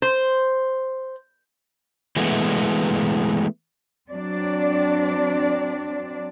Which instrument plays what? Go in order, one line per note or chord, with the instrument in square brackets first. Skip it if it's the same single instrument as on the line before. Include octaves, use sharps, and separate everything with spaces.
[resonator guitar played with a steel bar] C5
[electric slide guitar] E3 G#3 A3 B3
[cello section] F#3 C4 D4 D5